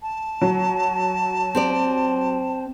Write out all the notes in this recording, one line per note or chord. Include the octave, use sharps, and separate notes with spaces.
A5
F#3
C4 G4 D5